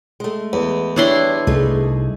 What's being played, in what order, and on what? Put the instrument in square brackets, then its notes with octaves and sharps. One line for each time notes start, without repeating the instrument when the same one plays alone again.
[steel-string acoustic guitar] G#3 A3
[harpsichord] E2
[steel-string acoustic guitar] G3 C#5 [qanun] D4 E4 C6
[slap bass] C2 [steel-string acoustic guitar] A3 D#4 G#4